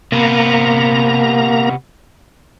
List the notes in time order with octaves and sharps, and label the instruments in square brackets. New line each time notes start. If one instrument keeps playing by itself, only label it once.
[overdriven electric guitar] C3 B3 [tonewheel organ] A#3 A#5